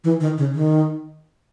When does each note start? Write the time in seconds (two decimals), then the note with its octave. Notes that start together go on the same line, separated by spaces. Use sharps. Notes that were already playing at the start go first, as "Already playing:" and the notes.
0.04 E3
0.20 D#3
0.38 C#3
0.55 D#3